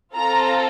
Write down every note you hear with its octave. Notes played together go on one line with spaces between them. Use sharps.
C4 F4 A4 A#5